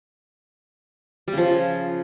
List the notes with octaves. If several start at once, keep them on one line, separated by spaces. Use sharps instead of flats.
G3
C#3
F3